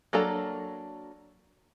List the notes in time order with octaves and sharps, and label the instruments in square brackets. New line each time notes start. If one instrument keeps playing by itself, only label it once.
[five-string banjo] F#3 A#3 D4 A4 A#5